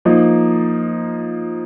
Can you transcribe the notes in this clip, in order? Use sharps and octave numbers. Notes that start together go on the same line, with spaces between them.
F3 A#3 D#4